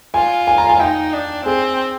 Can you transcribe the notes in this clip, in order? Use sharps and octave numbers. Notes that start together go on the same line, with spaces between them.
F4 G#5
G#5
A#5
G#5
D#4 G5
D4
C4 G#4